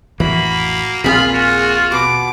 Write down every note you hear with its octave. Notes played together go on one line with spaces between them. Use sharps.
A1 F2 E3 A#3 F#4 B5
D#1 A#1 A#2 C4 F4 G#4 B5
F#4
B2 D6